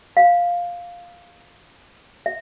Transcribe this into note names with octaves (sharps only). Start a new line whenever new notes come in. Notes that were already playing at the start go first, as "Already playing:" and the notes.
F5
E5